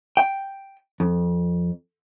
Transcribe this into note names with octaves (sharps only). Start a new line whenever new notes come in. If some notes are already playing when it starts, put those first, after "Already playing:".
G5
F2